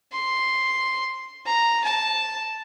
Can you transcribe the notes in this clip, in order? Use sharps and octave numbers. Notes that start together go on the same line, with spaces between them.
C6
A#5
A5